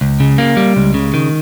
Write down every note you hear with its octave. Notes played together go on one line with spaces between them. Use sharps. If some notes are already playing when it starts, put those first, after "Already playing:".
C#2
C#3
A#3
G3
C#2
C#3
D#3